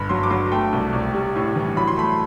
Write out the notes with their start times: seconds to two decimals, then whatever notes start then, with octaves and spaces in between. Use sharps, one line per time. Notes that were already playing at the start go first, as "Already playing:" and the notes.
Already playing: G1 B5
0.09 F#3 C6
0.23 D6
0.31 F#3 C6
0.52 A3 G5
0.73 C2
0.93 C2
1.14 G3
1.36 A2
1.56 E3
1.76 F#3 B5
1.88 C6
1.97 A3 B5